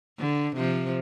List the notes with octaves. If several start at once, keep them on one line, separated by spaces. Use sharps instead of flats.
D3
C3 F3